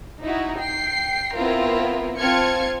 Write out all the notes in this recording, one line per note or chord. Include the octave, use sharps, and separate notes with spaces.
D#4 E4 F#4
G5 C7
B3 C4 E4 F4 A#4
C4 F4 A5 F6 G#6 C#7